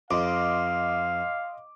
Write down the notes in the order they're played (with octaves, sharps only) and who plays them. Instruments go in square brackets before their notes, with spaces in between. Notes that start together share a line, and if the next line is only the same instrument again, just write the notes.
[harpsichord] F2 [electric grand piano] D#5 C6 D6 [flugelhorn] F5